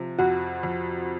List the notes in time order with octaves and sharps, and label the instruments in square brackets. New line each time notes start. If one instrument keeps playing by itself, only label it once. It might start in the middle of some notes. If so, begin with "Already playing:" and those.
Already playing: [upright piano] C3 F3
[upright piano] F2 [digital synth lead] F#4
[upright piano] F2